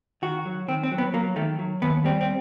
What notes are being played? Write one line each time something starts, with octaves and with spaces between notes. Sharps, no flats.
D#3 F#4
F#3
D#3 C4
C4
F#3
B3
F#3 A#3
D#3 A3
F#3
D#2 B3
G3 C4
C4